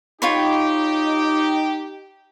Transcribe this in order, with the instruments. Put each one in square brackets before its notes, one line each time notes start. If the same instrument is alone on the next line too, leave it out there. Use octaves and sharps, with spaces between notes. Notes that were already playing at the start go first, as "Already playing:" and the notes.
[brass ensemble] D#4 G4 [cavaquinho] F4 C#5 B5